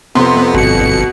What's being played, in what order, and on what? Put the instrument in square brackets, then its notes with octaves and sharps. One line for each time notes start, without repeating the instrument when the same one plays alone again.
[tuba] F2 [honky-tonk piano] C3 C6 [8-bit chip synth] B3
[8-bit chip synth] G1 C#7 [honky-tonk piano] B2